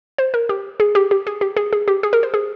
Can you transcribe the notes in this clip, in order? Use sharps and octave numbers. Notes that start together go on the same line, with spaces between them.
C5
A#4
G4
G#4
G4
G4
G#4
G4
G#4
G#4
G4
G#4
A#4
C5
G#4